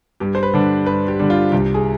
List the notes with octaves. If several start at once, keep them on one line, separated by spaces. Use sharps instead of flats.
G2 G4
C5
B4
D3 G3 D4
G2 B4
G4
D3 G3 D4
F4
C2 G4
G#4